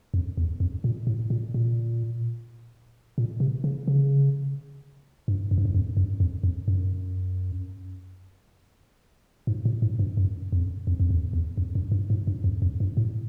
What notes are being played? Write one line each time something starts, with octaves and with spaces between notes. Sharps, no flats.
F2
E2
F2
A#2
A2
A#2
A#2
A#2
C3
C#3
C#3
G2
F#2
G2
F#2
F2
F#2
F2
F2
F#2
G#2
A2
G#2
G2
F#2
F2
F2
F2
E2
E2
F2
F#2
G2
G#2
G2
F2
F2
G2
A2